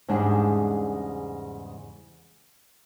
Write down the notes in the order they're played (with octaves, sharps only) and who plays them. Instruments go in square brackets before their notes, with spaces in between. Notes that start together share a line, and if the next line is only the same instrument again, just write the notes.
[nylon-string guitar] E2 G#2 C#3 G3 G#3 D4